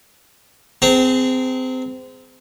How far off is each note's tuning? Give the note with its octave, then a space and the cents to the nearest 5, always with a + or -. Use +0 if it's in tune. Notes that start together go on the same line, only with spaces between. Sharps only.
C4 -25 G#4 +0 A#5 -35